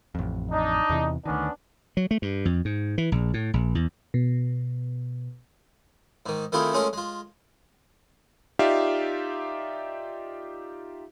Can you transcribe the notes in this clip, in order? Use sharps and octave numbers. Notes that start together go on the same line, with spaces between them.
A1 F2
D4 D#4
E2 C3 E3
D2 D#3 B3 C#4 D4
F#3
A3
G2
F2
G#2
E3
A#1
A2
A#1
E2
B2
G#2 D#3
D#3 A3 C4 E4 F4 G#4
G#3 A3 C#4 F4 G#4 A#4
G#3 F4
D#4 F4 G4 D5 E5 F5